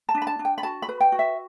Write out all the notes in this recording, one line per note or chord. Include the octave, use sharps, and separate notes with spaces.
A5
D4
B5
A5
D4
G5
B5
F#4 A5
B5
B4
G5
F#4
E5